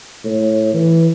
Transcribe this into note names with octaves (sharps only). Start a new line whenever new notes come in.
A2
E3